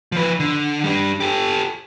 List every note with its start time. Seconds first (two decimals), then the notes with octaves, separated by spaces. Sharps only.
0.12 F3 B4
0.40 D3
0.84 G3 D4
1.20 G4 A4